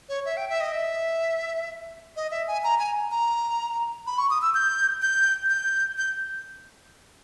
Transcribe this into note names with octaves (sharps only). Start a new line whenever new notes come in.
C#5
E5
G5
E5
D#5
E5
D#5
E5
G#5
A#5
G#5
A#5
B5
C#6
D#6
E6
G6
G6
G6
G6